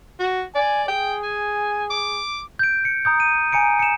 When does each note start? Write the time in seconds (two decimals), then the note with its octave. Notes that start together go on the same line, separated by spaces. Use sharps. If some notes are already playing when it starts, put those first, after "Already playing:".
0.20 F#4
0.55 D5 G#5
0.88 G#4 G5
1.23 G#5
1.90 D6
2.59 G6 D7
2.85 C#7
3.05 A#5 D#6 G6
3.20 D#7
3.52 G#5 A#5 C#7 D7
3.79 C#7 E7